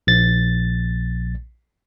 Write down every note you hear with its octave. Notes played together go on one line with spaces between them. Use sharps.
A#1 A6